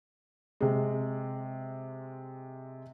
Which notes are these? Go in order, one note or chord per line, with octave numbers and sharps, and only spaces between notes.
C3 G#3